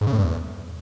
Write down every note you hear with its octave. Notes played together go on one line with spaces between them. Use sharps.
G#2
C#3
A2
G2
E2